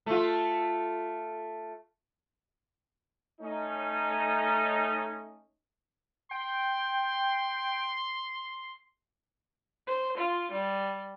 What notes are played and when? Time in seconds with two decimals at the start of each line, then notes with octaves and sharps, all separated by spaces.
0.06 A3 F4
3.41 A3 C#4 D#4
6.31 G5 C6
9.87 C5
10.16 F4
10.52 G3